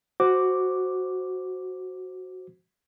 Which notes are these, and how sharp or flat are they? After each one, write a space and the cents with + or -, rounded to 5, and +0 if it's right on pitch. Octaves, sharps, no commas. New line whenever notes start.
F#4 +0 C5 +0 D6 +0